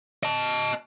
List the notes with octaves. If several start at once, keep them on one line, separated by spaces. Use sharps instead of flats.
D#5 A5